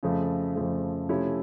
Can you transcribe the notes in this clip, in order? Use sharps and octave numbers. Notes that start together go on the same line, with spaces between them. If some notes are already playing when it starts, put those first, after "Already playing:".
F2 C#3 F3 A3
F2 C#3 F3 A3
C3 F3 A3 C#4 E4